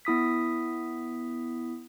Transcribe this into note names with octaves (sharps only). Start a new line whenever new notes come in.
B3 E4 D#6 B6